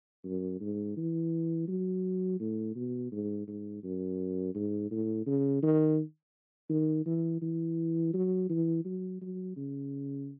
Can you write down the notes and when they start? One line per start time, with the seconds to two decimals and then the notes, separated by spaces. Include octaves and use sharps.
0.25 F#2
0.60 G#2
0.97 E3
1.68 F#3
2.40 A2
2.75 B2
3.12 G#2
3.48 G#2
3.83 F#2
4.55 G#2
4.91 A2
5.26 C#3
5.63 D#3
6.70 D#3
7.06 E3
7.42 E3
8.14 F#3
8.50 E3
8.85 F#3
9.21 F#3
9.56 C#3